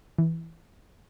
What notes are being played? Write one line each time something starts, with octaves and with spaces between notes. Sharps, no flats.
E3